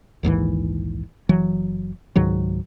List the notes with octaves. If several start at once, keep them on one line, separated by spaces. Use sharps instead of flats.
A#1 D#2 G#2 E3
F#1 E3 F#3
C#2 G#2 D#3 F#3